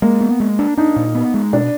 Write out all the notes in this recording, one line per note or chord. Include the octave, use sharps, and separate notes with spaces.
G#3 A#3
B3
G#3
D4
D4 D#4
A#2
B3
G#3
B2 D4